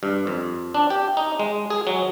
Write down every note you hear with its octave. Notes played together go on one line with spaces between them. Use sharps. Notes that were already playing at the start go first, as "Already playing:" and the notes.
G2
F2
D4
G4
D#4
G#3
G#4
F#3